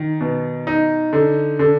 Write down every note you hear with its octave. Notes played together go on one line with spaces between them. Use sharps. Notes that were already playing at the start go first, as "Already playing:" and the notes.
Already playing: D#3
B2
D#4
D3
D3